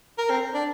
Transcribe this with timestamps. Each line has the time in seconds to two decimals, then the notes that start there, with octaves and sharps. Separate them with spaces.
0.18 A#4
0.30 C4
0.54 D4